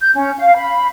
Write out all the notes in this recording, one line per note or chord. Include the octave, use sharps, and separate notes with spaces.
G6
C#4
F5
B5